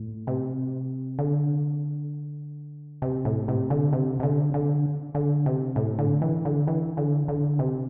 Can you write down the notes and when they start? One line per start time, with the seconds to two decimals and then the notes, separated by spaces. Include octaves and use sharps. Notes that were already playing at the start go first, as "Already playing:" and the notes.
Already playing: A2
0.27 C3
1.19 D3
3.02 C3
3.25 A2
3.48 C3
3.70 D3
3.93 C3
4.20 C3
4.23 D3
4.54 D3
5.15 D3
5.46 C3
5.76 A2
5.99 D3
6.22 E3
6.45 D3
6.68 E3
6.97 D3
7.28 D3
7.59 C3